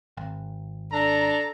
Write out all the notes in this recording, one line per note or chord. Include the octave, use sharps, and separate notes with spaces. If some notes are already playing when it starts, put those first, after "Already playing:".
G#1
D4 A4 A#5